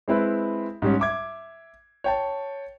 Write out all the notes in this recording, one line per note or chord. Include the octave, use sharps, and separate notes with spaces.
G#3 C4 E4 B4
G#2 G3 C#4
E5 D6 G#6
C#5 G5 A5